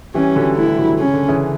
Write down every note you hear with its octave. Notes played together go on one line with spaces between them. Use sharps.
E3 G3 C#4
D3 F#3
F#3 A3 E4
E3 G3
D3 F#3
D3
C#3 C#4
D3
C#3 E3